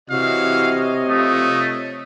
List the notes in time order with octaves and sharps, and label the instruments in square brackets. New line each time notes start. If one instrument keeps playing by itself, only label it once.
[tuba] C3 [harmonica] E3 F#4 [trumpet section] C#5 D#5 [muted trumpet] F5
[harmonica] F3 D#6 [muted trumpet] A3